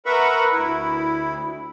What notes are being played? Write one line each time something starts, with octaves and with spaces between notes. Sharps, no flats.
A#4 B4 E5 F#5 B5 C#6
D2 E4